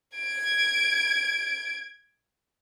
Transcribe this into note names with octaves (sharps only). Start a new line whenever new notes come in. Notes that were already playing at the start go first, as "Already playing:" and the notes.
G#6 D7